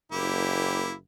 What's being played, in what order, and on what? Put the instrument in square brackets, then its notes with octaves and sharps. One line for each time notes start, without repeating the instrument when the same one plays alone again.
[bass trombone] F#1 [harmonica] A#3 E4 G4